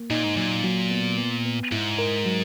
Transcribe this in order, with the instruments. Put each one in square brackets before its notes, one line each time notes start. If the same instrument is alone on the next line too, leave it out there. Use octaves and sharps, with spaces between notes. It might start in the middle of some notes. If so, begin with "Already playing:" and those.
Already playing: [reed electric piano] A#3
[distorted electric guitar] A#2 [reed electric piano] D#4
[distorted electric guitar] G#2
[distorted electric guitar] A#2 [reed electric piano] F#3
[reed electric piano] F#3
B3
B3
B3
[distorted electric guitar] G#2 [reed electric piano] E4
[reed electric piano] A#4
F#3